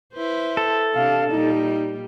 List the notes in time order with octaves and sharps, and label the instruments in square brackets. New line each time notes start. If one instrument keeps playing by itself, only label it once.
[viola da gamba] E4 B4 C5
[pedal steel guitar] A4
[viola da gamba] C3 D4 [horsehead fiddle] F5
[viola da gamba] A#2 G3 [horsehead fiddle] D#4